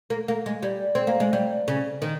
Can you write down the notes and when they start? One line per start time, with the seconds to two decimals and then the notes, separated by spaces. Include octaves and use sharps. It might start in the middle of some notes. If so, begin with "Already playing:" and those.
0.10 A#3
0.28 A#3
0.46 G#3
0.63 G3
0.95 C4
1.07 A#3
1.20 G#3
1.33 G3
1.68 C#3
2.02 D#3